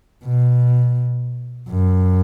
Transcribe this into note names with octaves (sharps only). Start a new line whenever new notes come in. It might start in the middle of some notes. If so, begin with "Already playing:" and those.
B2
F#2